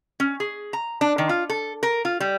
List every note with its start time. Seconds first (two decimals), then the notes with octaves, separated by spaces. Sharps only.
0.20 C#4
0.40 G#4
0.73 A#5
1.01 D4
1.18 D#3
1.29 F4
1.50 A4
1.83 A#4
2.05 F4
2.20 G3